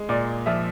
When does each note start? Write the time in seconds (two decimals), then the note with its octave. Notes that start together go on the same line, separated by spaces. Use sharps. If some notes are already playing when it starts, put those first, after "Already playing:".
Already playing: G#3
0.09 A#2 D5
0.46 F3 E5